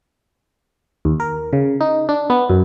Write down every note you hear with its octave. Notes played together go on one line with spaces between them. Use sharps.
D#2
A#4
C#3
D#4
D4
B3
F#2